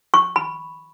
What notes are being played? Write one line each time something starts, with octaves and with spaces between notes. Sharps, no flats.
C#6
B5